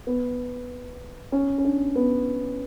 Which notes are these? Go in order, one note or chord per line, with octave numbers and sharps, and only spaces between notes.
B3
C#4
C#4
D4
B3